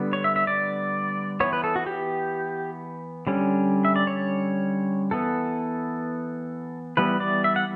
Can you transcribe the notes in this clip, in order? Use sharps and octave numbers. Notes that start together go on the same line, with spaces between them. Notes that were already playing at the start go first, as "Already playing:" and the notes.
Already playing: D3 G3 B3
C#5
E5
E5
D5
E3 B3 C#5
B4
A4
F#4
G4
D3 G3 C#4
E5
D5
C#5
E3 B3 A4
E3 G3 B3 B4
D5
E5
F#5